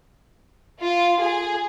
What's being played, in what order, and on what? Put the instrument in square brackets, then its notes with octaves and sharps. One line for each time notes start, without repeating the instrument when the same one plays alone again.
[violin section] F4
G#4